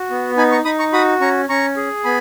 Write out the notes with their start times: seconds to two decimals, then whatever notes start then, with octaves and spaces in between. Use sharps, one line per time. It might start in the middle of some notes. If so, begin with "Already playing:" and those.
Already playing: F#4
0.10 B3
0.37 D#4 G#5 B5
0.52 A#5 C#6
0.65 D#4 B5 D#6
0.79 A#5 C#6
0.93 F#4 B5 D#6
1.21 C#4 A#5 C#6
1.49 C#4 A#5 C#6
1.77 G#4
2.04 B3 G#5 B5